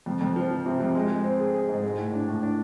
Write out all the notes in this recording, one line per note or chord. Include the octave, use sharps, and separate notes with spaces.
F2
F2
F3
F3
C3
F2
G#3
G#3
C4
G#4
G#4
G#2
G#3
A2
D4
A2
D4